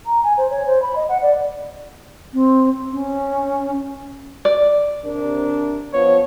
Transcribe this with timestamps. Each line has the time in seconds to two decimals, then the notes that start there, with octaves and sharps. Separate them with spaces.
0.06 A#5
0.23 G#5
0.38 C5
0.50 C#5
0.66 C5
0.82 B5
0.95 D#5
1.08 F#5
1.22 D5
2.34 C4
2.93 C#4
4.45 D5
5.05 C3 D4 A#4
5.93 F3 B3 C#5